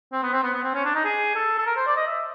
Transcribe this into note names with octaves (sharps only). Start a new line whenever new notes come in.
C4
B3
C4
B3
B3
C4
C#4
D4
D#4
G#4
A4
A4
A#4
C5
D5
D#5
E5